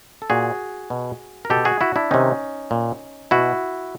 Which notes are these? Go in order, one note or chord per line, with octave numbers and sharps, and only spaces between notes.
A4
A#2 F#4 G#4
B2
A#4
B2 G4 A4
F#4 G#4
E4 F#4
D4 E4
C3 D#3 C#4 D#4
A#2
B2 E4 F#4